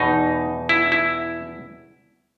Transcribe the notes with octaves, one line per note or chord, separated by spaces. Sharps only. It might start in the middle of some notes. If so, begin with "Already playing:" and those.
Already playing: E2 B2 D#4
E4
E4